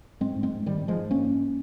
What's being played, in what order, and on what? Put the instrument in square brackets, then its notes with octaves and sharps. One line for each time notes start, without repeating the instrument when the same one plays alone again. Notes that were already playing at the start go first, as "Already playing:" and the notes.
[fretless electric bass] G#2 G#3 C4
G#2
G#3 C4
G#2
G#2 D#3 G3
G#2
F3 G#3
G#2
G2 A#3 C#4
G2